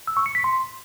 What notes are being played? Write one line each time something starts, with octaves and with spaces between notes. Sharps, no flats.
E6
C#6
C#7
B6
C6